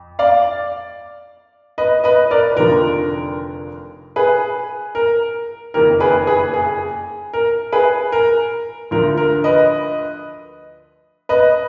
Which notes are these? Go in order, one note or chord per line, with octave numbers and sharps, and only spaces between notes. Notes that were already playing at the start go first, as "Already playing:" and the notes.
Already playing: F2
D5 F5
B4 D#5
B4 D#5
A#4 D5
B4
F1 D#2 D3 F3 A#4
G#4 B4
A#4
F#1 F2 D#3 A#3 A#4
G#4 B4
G#4 B4
G#4
A#4
G#4 B4
A#4
D2 D3 F3 A#4
A#4
B4 D#5
B4 D#5